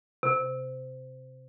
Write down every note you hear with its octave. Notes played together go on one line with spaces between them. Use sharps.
C3